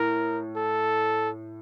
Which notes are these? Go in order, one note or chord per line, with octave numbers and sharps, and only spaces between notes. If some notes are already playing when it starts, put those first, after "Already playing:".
Already playing: A2 A#4
A4